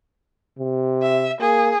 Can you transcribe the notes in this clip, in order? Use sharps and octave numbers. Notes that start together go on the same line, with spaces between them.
C3
E5
A#3 G#4